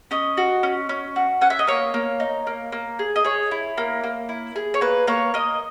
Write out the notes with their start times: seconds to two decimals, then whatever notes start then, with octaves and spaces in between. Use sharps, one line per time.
0.11 C#4 D#5
0.37 F#4
0.63 C#4
0.89 C#4
1.16 F#4
1.41 C#4 F#5
1.50 E5
1.59 D#5
1.67 A#3 C#5
1.94 A#3
2.20 D#4
2.47 A#3
2.72 A#3
2.99 G#4
3.16 D#5
3.24 G#4 C#5
3.51 E4
3.78 A#3
4.04 A#3
4.29 E4
4.56 G#4
4.74 C#5
4.81 A#3 B4
5.07 A#3 C#5
5.34 A#3 D#5